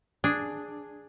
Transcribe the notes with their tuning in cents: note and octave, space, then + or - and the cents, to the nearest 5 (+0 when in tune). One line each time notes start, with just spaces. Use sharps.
D4 +0 G#4 +0